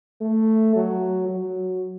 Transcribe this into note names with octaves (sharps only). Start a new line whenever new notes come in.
A3
F#3
F#3